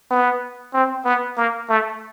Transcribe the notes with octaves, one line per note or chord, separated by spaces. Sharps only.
B3
C4
B3
A#3
A3